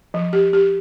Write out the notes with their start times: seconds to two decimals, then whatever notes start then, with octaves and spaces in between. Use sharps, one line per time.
0.14 F3
0.33 G4
0.53 G4